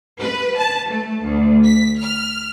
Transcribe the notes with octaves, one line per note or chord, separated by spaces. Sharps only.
B4
A5
A3
D2
B6
F6